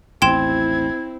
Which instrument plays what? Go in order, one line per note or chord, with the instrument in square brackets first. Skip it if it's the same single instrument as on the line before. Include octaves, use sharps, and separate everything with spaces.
[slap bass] A1 D#2 [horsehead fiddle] C4 E4 [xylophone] G5 C6 E7 [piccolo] G#6